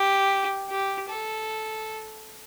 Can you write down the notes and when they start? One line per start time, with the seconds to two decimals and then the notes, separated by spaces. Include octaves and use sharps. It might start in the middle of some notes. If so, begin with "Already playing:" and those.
Already playing: G4
0.70 G4
1.10 A4